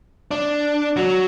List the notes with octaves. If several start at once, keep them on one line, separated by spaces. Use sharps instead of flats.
D4
F#3